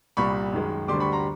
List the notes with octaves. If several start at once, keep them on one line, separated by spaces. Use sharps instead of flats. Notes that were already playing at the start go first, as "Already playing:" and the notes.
C2 A#2 G3 B5 C#6
F#2 D#3 G#3
D2 D3 G3 C6 D6
B5 C#6
A#5 C6